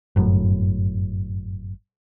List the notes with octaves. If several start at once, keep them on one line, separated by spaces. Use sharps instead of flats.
G1 F#2 A2